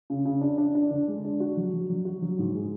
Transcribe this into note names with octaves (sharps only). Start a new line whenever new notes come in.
C#3
C#3
D4
D4
D4
D3
G#3
D4
F#4
F#3
F#3
F#3
F#4
F#3
G#2
G#3